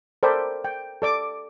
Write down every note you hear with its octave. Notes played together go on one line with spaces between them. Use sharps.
A4 A#4 C5 D5 G5 B5
G5
A4 D5 D6